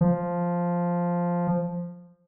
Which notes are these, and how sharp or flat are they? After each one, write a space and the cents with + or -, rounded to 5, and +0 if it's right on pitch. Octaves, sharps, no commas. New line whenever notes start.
F3 +0